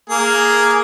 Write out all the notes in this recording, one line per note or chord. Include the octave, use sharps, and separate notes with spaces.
A#3 G#4